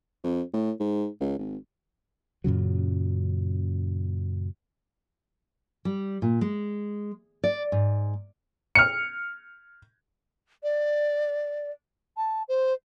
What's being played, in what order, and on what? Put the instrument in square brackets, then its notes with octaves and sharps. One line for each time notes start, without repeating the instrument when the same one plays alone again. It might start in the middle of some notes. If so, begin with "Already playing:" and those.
[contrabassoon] F2
A2
G#2
C#2
G#1
[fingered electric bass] F#2 A#2 C#3 F#3
[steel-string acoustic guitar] G3
A#2
G#3
D5
G#2
[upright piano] F6 C#7
[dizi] D5
A5
C5